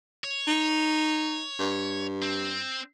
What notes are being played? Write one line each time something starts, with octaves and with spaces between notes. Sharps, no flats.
C#5
D#4
G2
C4